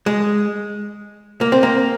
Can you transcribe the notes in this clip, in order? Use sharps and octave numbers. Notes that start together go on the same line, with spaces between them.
G#3
A#3
C4
A#3